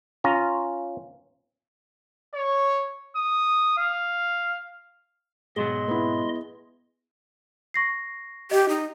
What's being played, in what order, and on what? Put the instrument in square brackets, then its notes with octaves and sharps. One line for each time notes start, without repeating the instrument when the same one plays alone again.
[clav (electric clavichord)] C#4 F4 A#5
[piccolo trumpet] C#5
D#6
F5
[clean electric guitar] G#2 B2 F#3 [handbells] G#4 [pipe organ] D#5 C6
[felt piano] B3 E4
[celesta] C#6 A#6 C7
[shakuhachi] G4 [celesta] D#5
[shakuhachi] D#4